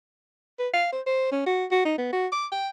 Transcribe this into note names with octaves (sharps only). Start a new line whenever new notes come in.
B4
F5
C5
C5
C#4
F#4
F#4
D#4
B3
F#4
D6
G5